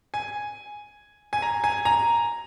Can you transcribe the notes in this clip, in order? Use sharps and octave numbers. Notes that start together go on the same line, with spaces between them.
G#5
G#5
A#5
G#5
A#5